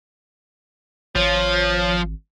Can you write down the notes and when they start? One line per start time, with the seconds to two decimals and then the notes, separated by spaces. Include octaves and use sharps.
1.15 G#1 F3 C#5